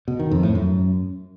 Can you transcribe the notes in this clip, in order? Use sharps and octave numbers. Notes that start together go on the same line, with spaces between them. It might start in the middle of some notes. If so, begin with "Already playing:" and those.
B2
D#3
F2
A2
F#2